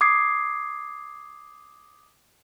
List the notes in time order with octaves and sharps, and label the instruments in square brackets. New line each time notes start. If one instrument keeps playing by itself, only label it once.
[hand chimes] D6 D#6 G#6 C7